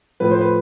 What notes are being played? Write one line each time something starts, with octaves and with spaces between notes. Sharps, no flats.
A2 F3 B4
C5
B4